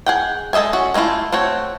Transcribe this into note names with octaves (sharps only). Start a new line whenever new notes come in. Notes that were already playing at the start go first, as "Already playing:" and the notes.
G#4 F#5 G5
G#3 A4 D#5 E5 G#5
C#4 F#4
G#3 A3 C#4 E4 F4
A3 C4 F#4 C#5